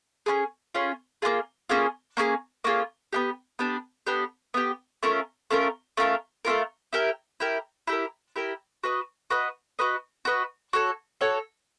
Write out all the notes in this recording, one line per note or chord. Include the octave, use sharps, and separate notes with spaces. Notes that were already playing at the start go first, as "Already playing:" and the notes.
C#4 F4 G#4
C#4 F4 G#4
A#3 C#4 F4 G#4
A#3 C#4 F4 G#4
A#3 C#4 F4 G#4
A#3 C#4 F4 G#4
B3 D4 G4
B3 D4 G4
B3 D4 G4
B3 D4 G4
A3 C#4 F4 A#4
A3 C#4 F4 A#4
A3 C#4 F4 A#4
A3 C#4 F4 A#4
E4 G4 A#4
E4 G4 A#4
E4 G4 A#4
E4 G4 A#4
F#4 B4 D#5
F#4 B4 D#5
F#4 B4 D#5
F#4 B4 D#5
F#4 A4 C#5
F#4 A4 C#5